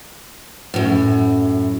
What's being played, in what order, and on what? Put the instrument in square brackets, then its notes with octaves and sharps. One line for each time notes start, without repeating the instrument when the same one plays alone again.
[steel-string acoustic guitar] F#2 A2